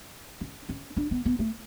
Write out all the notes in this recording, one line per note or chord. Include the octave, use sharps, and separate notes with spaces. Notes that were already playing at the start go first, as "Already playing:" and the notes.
C#4
C#4
D4
B3
B3
A3